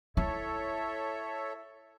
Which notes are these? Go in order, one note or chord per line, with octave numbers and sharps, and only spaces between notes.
E4 A4 C#5 E5